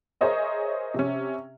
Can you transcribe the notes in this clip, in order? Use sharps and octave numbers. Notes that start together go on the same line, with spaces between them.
G#4 A#4 C5 C#5 D#5 E5
C3 C#4